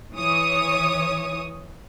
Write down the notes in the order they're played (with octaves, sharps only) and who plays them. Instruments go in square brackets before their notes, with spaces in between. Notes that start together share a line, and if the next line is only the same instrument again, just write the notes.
[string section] E3 C#5 D#6